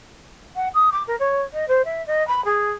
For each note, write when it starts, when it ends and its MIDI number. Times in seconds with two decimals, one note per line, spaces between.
0.56 0.69 78
0.74 0.90 87
0.92 1.03 86
1.07 1.16 70
1.19 1.42 73
1.53 1.65 75
1.68 1.85 72
1.85 2.05 76
2.07 2.26 75
2.28 2.44 83
2.45 2.71 68